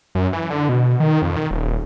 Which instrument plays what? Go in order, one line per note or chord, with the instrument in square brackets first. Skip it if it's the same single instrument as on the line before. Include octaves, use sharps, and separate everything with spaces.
[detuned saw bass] F#2
E3
D3
B2
D#3
F2
D#3
D#1